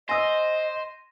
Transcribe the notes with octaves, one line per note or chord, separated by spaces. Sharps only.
C5 D#5 G#5 C6 D#6 E6 A#6 D#7